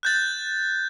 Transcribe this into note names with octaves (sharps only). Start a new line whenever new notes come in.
F#6 G6 A6